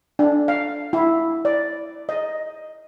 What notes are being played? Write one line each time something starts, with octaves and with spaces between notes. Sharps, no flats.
D4
F5
E4
D5
D#5